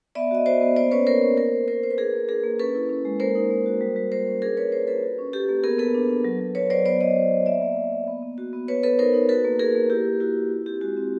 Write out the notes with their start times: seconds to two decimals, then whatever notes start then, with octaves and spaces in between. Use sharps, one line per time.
0.15 B3 D5 E5
0.31 F#4 D#5
0.46 F#4 C5 D5
0.61 B3
0.76 A#3 C5 D5
0.91 C#4 B4 C#5
1.07 A#3 A#4 C5
1.22 C#4
1.37 A#3 A#4 C5
1.52 A#3
1.68 A#3 A#4 C5
1.83 A#3 C5
1.90 B4
1.98 D4 G#4 A#4
2.14 A#3
2.29 D4 G#4 A#4
2.44 A#3
2.59 C#4 A4 B4
2.75 E4
2.89 C#4
3.05 G#3
3.20 A#3 A#4 C5
3.35 D#4
3.51 A#3
3.66 F#4
3.81 G3
3.96 G3
4.11 A#3 A#4 C5
4.27 C#4
4.42 D4 G#4 A#4
4.57 A#3 B4 C#5
4.72 A#3 A#4 C5
4.87 F4 A4 B4
5.03 F#4
5.19 C#4
5.33 F#4 G4 A4
5.49 A#3
5.64 B3 G#4 A#4
5.79 B3 A4 B4
5.94 D4
6.09 D4
6.24 F#3
6.40 F#3
6.55 F#3 B4 C#5
6.70 F#3 C5 D5
6.86 B3 C5 D5
7.00 B3 C#5 D#5
7.16 F#4
7.31 B3
7.46 A#3 D5 E5
7.62 A#3
7.77 A#3
7.92 A#3
8.08 B3
8.23 B3
8.38 F#4
8.53 B3
8.68 B3 B4 C#5
8.83 B3 A4 B4
8.99 D#4 A#4 C5
9.14 D#4
9.29 F#4 A4 B4
9.45 A#3
9.59 A#3 G#4 A#4
9.75 A#3
9.90 E4 G4
10.05 E4
10.20 E4 F#4
10.36 E4
10.51 F4
10.66 C4 G4
10.81 G#3 F#4
10.97 C4